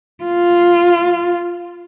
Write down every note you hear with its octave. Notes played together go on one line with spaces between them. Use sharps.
F4